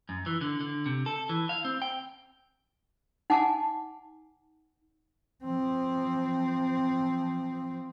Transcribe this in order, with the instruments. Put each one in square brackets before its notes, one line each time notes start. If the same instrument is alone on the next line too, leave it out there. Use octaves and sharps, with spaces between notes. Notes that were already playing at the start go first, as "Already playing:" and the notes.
[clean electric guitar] F#2
E3
D3
D3
C3
A4
E3
F5
C4
G5
[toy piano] D#4 F#5 G#5 A5 D6
[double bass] F3 C4